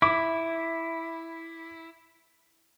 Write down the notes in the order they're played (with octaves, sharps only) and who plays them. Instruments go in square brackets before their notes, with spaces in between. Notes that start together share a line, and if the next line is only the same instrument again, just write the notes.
[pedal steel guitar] E4 [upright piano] D6